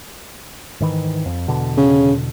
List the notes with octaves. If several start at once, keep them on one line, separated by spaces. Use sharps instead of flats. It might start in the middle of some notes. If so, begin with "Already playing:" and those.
G#2 D#3 E3
F2
E2 B2 D3
C#3